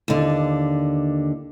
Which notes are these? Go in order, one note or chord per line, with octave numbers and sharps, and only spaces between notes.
D#2 D3